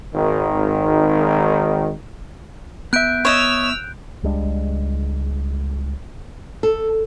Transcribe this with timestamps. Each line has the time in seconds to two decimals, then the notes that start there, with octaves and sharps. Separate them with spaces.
0.14 G#1 D#3
2.93 B3 E5 F#6 G6 D7
3.25 C#5 D#5 E6 F7
4.23 C#2 G3 G#3 D4
6.63 A4